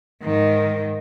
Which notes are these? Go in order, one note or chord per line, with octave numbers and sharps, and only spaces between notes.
G#2 D#3